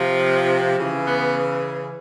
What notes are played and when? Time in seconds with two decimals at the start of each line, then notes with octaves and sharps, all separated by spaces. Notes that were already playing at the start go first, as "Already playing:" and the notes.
Already playing: C3 F3
0.77 C#3 E3
1.06 B3